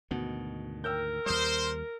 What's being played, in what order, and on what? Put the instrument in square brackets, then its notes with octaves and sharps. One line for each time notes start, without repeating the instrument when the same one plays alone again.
[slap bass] D2 G#2 D#3 [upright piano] B2
[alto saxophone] A#4 [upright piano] G5 E6 G6
[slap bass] D#2 G3 [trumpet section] C5 [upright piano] D#6 F6